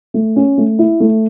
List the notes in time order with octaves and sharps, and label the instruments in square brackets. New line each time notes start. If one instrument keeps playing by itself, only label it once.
[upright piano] A3
C#4
A3
E4
A3